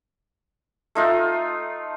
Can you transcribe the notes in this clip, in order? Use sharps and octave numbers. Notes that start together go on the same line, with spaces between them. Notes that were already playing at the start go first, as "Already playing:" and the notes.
A3 D#4 F4